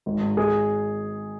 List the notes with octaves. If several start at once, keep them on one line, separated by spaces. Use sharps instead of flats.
G#1
G#2
G#1 G#4